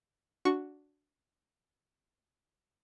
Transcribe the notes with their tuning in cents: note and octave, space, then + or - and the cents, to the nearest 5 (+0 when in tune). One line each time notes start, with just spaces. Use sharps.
D4 -10 F#4 +0 C#6 +0